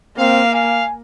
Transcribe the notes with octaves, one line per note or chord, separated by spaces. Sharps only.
A#3 C4 F5
F5 G#5